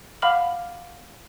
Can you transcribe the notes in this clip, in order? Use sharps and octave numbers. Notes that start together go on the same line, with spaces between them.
F5 F#5 B5 D6 F6 F#7